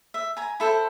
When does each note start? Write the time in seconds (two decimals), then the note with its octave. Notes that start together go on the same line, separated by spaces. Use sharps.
0.14 E5
0.37 G#5 A#5
0.60 E4 A4 C5